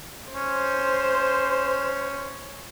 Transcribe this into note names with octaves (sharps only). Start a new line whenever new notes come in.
C#4 C5